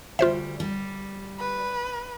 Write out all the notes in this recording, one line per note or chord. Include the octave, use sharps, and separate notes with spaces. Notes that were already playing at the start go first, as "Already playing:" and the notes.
D2 G3 F4 C5 E5
G3
B4